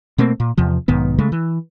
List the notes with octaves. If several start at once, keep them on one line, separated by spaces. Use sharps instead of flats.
B2 A3 A#3 C4
A#2
E2 C3 F3
B1 G#2 D#3 B3
C#3 G#3 A3
E3